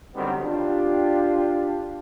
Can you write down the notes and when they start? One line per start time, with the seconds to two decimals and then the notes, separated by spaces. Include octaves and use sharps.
0.14 D3 D#3 F#3 G3 B3 C4
0.43 D4 F4 G4